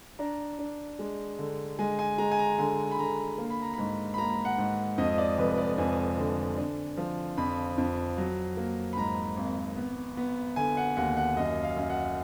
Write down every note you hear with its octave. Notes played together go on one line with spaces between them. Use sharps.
D4 A#5
D4
G#3
D3
G#3 G#5
G#5
G#3 A#5
G#5
A#5
D3 G#5
B5
D3 A#5
A#3
B5
A#5
G#2 B5
B5
A#3 A#5
F#5
G#2
F2 D#5
D5
F1 B4
D5
F2 G#5
D3
D4
F3
F2 B5
F2
F#3
A#3
B5
G#2 A#5
G#1
B3
B3
D3 G#5
F#5
D#2 F#5
F#5
F#2 D#5
F5
F#2
F#5